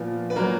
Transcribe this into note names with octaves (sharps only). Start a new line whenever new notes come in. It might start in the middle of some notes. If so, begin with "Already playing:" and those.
Already playing: A#2 F3 B3
B4
A#2 F#3 A#3 A#4